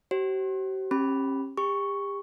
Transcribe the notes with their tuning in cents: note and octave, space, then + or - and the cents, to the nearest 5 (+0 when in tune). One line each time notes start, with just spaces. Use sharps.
G4 -45 C5 +35
C#4 -40 G4 +5 B5 +0
G4 +35 C#6 +0